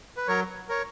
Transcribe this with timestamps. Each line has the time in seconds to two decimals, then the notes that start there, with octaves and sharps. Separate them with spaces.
0.17 B4
0.27 F#3 A#4 C#5
0.69 A#4 C#5